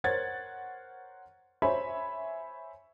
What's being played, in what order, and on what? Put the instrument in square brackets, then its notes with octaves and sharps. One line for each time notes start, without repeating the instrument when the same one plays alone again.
[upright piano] A#4 C5 C#5 F#5 G#6 A6
C5 C#5 E5 G#5 B5